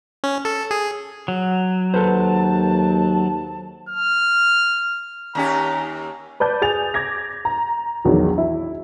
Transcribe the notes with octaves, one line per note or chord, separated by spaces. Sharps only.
C#4
A4
G#4
F#3
D#2 A4 B4 C5 A5
F6
D#2 C#4 G4 A#5
B4 D5 A5 G6
G#4 G#5 A6 F7
D6 G#6 A#6
A#5
A#1 E2 D#3 F#3
E4